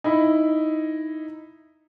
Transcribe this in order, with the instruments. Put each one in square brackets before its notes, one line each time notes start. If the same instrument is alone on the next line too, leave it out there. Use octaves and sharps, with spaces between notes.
[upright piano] D#4 E4 B5